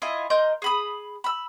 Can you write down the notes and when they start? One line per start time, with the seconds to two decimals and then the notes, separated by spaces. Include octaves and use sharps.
0.02 E4 F4 D#5 G#5
0.30 A#4 D#5 C6 G6
0.62 G#4 B5 D#6
1.24 B5 E6